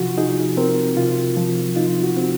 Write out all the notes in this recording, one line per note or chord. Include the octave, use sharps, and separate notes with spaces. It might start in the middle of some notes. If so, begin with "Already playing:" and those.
Already playing: C3 F3 F4 F#4
D#4 G#4
C4 A#4
C3 F4
F3
D#4 F4
F#4
C4